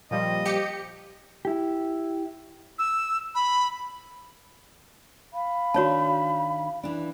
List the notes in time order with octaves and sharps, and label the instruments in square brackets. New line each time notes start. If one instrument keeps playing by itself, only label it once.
[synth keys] A#2 F3 G3 [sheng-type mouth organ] D#5
[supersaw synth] G4 C#7
[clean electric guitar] E4 G4
[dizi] E6
B5
[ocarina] F5 [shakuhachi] B5
[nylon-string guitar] D#3 D4 [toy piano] F#4 C#5 A5
[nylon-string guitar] E3 D4